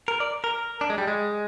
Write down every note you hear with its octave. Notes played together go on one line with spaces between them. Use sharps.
A#4
D5
A#4
D4
G#3
G3
G#3